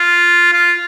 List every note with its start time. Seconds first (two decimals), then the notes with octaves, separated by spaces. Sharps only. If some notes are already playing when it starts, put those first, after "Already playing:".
Already playing: F4
0.52 F4